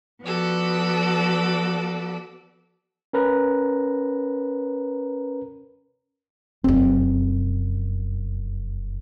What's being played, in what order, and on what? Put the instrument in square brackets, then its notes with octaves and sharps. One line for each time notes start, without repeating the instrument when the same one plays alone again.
[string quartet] F3 B3 F#4 A4 D5
[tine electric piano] C#4 A#4 B4 A#5
[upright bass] F1 F#2 [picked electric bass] C4